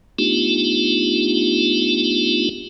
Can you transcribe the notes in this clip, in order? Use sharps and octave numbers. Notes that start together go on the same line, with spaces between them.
A3 B3 D4 D#4 F4 G4